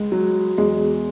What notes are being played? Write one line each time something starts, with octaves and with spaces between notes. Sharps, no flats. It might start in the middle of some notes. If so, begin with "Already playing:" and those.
Already playing: C#2 G#3
F#3
E2 G#3